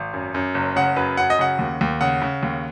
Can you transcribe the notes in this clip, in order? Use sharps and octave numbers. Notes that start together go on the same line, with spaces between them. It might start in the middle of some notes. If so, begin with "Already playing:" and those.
Already playing: G#1
F#2
F#2
F#1
C#3 F#5
F#2 B4
F#2 F#5
D#5
C#3 F#5
D#2
D#2
C#3 F#5
C#3
D#2